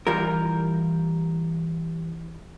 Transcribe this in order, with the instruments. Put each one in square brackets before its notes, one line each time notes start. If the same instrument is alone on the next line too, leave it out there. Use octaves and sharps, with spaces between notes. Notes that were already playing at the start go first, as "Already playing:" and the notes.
[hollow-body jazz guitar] E3 G3 F4 A#4